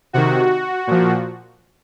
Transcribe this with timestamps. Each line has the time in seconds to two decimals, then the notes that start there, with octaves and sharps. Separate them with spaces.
0.13 C3 D#3 F#4
0.87 A#2 F3